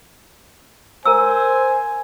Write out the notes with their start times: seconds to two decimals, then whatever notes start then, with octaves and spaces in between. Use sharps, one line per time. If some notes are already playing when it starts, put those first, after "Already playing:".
1.06 A#4 C5 G#5 A#5 E6